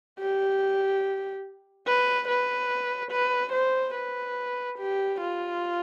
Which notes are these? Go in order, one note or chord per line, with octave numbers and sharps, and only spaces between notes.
G4
B4
B4
B4
C5
B4
G4
F4